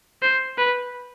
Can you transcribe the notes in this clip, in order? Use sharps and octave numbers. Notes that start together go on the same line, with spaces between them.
C5
B4